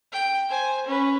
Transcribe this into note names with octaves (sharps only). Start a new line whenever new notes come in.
G5
C5 G#5
C#4 B4